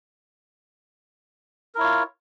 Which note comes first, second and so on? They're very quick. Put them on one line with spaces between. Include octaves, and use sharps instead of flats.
A#4 E4 C#5 F4